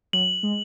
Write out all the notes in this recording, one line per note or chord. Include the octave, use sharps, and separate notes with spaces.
F#3 F#7
G#3